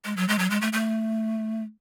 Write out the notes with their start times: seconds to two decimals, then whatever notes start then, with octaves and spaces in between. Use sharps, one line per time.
0.05 G#3
0.17 F#3
0.28 G#3
0.39 F#3
0.50 G#3
0.61 A3
0.73 A3